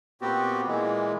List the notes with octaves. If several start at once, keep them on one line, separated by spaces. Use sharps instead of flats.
A#2 B3 C4 F#4 G4
A#2 E3 G#3